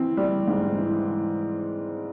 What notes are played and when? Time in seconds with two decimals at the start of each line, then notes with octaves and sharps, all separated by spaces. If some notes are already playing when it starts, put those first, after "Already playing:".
Already playing: E3 C4
0.17 G3
0.47 G#2
0.78 E3